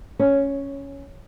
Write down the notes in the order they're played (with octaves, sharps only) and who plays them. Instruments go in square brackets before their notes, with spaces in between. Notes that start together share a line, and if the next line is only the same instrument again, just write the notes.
[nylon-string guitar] C#4